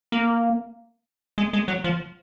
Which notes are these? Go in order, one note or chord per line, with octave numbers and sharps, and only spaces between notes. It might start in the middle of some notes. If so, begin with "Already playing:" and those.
A#3
G#3
G#3
F#3
F3